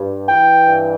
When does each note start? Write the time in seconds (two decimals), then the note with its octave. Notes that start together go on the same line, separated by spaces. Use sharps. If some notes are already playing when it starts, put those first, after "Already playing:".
Already playing: G2
0.27 E3 G5
0.67 G2